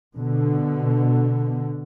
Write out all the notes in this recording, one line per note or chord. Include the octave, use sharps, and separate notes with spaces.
B2 D3